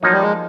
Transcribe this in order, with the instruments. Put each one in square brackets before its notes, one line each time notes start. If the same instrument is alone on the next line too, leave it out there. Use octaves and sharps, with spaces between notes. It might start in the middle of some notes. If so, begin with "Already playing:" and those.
[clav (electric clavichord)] F3 A#3 D#4 [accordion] F#3
[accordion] G3
G#3